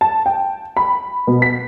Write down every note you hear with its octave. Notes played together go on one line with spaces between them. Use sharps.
A5
G5
B5
B2
B6